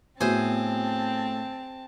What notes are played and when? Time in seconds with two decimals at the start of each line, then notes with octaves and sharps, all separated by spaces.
0.21 A2 B3 C4 F#4 G#4 C5 A5